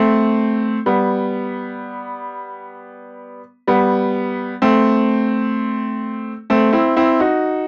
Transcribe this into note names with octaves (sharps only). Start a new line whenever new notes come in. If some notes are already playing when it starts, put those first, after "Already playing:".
Already playing: A3 C4
G3 B3
G3 B3
A3 C4
A3 C4
C4 E4
C4 E4
D#4 F#4